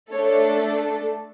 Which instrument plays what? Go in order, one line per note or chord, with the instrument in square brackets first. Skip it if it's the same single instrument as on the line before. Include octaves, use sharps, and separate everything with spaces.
[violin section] A3 D4 A4 C#5